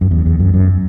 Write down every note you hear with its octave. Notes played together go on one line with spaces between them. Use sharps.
F#2
E2
E2
F#2
F#2